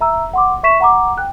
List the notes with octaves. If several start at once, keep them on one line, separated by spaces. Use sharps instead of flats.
E5 A#5 E6
F#5 C6 D6
E5 C#6 B6 E7
F#5 A#5 D6
G5 F#6